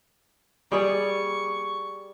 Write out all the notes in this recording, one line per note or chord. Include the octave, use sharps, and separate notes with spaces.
G3 G#4 D5 C#6